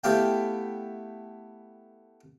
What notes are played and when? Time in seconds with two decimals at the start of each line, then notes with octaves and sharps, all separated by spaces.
0.04 A3 B3 E4 G4 F5 G5